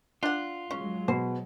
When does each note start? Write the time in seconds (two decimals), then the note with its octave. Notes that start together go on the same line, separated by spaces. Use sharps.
0.23 D4 F4 F#5
0.71 F#3 G#3 C#4
1.08 B2 C5